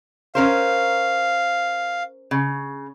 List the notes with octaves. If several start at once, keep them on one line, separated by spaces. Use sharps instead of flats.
C#4 A#4 C5 F5
C#3